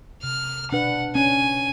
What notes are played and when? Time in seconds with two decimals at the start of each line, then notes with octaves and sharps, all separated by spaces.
0.23 C3 F6
0.71 B2 D4 B4 F#5
1.15 C#4 G#5